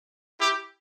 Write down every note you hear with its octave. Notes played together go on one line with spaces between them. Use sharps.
E4 G4